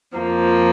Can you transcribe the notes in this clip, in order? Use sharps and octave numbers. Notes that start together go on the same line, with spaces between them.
F2 F3 A#3